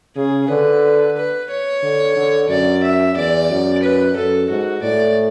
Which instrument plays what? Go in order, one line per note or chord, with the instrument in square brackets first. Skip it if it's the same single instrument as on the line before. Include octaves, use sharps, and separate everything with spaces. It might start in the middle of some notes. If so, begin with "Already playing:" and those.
[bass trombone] C#3 [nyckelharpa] G#4
[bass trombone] D3 [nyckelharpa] B4
[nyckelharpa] B4
C#5
[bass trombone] D3
D3
[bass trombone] F#2 [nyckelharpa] D5
[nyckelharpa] E5
[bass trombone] E2 [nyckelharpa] D5
[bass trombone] F#2
[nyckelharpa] B4
[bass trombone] F#2 [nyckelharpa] A4
[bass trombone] G#2 [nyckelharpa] F#4
[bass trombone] A2 [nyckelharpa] D5